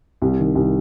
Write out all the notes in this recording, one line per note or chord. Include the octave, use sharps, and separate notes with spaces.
C2
D#3
C2